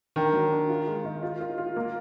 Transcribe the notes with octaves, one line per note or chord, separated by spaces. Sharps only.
D#3 D4
F#3
D4
F4
G#3
D#3
F4
F4
F4
A#3